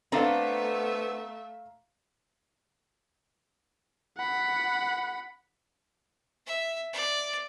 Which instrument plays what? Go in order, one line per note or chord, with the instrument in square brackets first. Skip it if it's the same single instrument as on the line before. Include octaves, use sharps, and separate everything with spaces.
[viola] A3 E5 [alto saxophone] B3 [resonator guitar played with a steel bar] C4 D4 A4 [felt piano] F5 A#5
[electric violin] F#5 B5
[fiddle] E5
D5